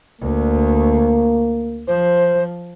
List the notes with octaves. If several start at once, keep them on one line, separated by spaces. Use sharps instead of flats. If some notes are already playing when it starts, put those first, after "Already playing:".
D2 A#3
F3 C5